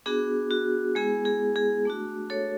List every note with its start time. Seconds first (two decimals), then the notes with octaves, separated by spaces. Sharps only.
0.06 B3 D4 F#4 G#4
0.51 F#4
0.95 G#3 B3 E4 G#4
1.25 G#4
1.56 G#4
1.85 A3 D4 F#4
2.30 A4 C#5